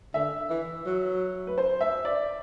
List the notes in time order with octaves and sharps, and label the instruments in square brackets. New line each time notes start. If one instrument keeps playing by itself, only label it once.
[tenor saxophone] D3 [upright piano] E5
[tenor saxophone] E3
F#3
[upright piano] B4
C5
E5
D5